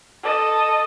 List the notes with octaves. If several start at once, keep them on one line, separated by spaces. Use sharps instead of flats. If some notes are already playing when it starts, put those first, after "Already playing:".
A4 D#5